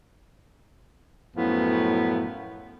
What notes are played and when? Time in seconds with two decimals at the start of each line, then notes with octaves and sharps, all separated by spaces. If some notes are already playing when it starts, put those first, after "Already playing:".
1.36 F#2 A2 F3 B3